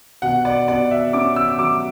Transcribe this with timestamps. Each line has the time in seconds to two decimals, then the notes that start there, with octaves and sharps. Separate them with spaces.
0.22 B2 F#5
0.45 D5
0.68 B2 D5
0.91 E5
1.13 C#4 D6
1.36 E6
1.59 F#3 D6